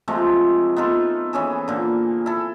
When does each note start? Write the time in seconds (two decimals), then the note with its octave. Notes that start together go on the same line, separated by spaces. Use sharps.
0.08 C3 F3 G#3 A3
0.76 B3 D#4 F4 A4
1.33 E3 C#4 G#4 A4
1.68 A#2 D3
2.26 E4 A4